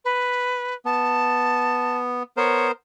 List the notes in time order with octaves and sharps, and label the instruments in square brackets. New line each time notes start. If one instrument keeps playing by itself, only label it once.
[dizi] B4
[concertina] B3 [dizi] A5
[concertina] B3 A#4 C5 [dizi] C#5